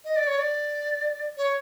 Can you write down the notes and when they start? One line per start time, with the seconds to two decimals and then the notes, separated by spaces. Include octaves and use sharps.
0.04 D#5
0.16 D5
0.27 C#5
0.39 D5
1.37 C#5